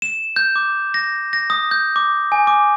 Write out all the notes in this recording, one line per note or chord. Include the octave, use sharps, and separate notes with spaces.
E7
G6
D6
A#6
A#6
D#6
G6
D6
G#5
D6